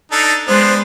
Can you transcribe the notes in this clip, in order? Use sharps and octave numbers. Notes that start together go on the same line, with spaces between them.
D4 D#4 A4
G#3 B3 D4 C5